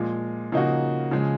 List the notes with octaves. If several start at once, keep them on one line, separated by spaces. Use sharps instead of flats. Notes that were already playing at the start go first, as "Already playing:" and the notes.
Already playing: A#2 F3 G#3
C#3 F3 A#3 D#4 F#4
C#3 F3 G#3